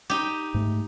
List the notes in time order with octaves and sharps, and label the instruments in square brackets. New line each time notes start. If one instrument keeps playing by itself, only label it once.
[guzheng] D#4 G4
[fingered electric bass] G#2 A3